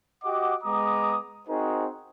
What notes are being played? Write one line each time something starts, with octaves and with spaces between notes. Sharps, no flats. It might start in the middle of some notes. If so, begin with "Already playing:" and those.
F#4 G4 D#5 F#5 D6
G#3 B3 A#5 D6 D#6
C4 D#4 F#4 G#4 A#4 C5